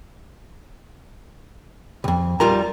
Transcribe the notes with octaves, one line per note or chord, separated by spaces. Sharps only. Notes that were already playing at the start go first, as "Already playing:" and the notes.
C2 F2
G3 F4 A#4 A#5